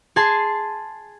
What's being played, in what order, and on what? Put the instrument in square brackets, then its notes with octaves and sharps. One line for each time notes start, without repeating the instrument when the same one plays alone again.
[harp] G#4 G#5 A5 C6